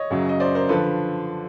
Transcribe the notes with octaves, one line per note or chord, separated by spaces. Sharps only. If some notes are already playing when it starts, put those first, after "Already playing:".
Already playing: C#5 D#5
F#2 C#3 F#3
D#5
C5 D5
A#4 C5
D3 F3 A4 B4